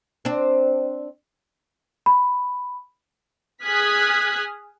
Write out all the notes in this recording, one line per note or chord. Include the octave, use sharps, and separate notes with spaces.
C4 D4
B5
G#4 D#6 F6 F#6 G#6 B6